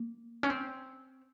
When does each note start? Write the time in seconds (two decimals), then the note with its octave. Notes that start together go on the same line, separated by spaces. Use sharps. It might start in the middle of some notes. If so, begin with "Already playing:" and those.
Already playing: A#3
0.43 C#4
0.50 C4